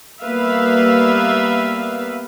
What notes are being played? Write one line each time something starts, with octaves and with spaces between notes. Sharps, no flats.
G3 A#3 B3 B4 E5 F5